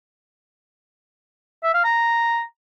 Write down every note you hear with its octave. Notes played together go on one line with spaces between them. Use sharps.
E5
F5
A#5